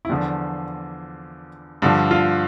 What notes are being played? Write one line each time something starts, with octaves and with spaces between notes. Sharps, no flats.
E4
E2 D3 F3 F4
G2 D3 F3
F4